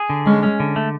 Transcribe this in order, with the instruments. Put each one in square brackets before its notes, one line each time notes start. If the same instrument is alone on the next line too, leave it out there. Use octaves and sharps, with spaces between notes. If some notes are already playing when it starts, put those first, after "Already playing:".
Already playing: [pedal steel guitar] G#4
D3
[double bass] G#3 [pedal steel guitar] C#4
[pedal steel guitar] C#4
D3
A3